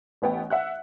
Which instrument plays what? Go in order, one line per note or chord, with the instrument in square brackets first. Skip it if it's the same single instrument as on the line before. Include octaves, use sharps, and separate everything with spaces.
[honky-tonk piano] A1 B3 G5
E5 F#5 F#6